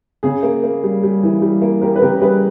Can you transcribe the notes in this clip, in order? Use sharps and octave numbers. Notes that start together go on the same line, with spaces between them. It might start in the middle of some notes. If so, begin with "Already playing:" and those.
C#3 G#4
A#3
A#3
G3
G3
E3
G3
A#3
A#3 G4 A#4
B4
C#3 G4 A#4
G3 G#4 B4